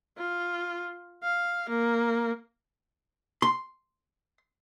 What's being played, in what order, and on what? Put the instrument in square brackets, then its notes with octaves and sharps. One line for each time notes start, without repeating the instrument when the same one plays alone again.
[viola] F4
F5
A#3
[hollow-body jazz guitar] C6